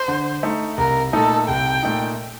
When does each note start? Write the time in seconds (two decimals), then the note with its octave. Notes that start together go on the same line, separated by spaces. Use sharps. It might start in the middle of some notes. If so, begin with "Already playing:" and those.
Already playing: C5
0.08 D3
0.43 A3 D#4
0.78 C2 A#4
1.13 A#2 A3 D#4 A4
1.48 C2 G5
1.83 A#2 A3 D#4